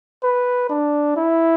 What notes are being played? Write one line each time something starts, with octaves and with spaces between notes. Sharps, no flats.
B4
D4
E4